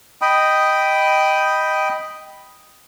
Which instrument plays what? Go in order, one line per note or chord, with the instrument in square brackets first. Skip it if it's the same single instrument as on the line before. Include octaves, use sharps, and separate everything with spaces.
[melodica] D#5 G5 B5 D#6